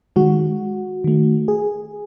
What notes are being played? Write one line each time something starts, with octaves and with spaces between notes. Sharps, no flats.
D#3 G#3 F#4
D#3 A3
G#4